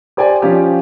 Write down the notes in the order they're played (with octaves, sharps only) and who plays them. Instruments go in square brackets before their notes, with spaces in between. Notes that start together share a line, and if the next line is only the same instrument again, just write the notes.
[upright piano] G4 C5 D5 G5 G#5
F3 C#4 F4 G4